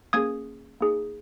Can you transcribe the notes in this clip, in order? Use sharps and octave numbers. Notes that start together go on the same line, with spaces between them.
A#3 C#4 G#4 D#6 G#6
A#3 D#4 G#4